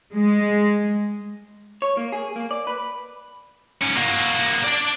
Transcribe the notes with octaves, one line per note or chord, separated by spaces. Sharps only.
G#3
C#5
A#3
G#4
A#3
D5
B4
G#2 C#4
A#3 F#4
D4 D5